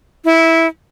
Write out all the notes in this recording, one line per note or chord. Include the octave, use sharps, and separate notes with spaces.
E4